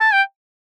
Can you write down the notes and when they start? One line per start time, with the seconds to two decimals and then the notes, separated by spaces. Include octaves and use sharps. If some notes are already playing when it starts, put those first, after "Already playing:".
0.01 A5
0.13 G5